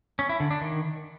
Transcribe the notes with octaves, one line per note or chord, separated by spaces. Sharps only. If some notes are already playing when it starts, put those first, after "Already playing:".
C#4
E4
D3
D4
D#3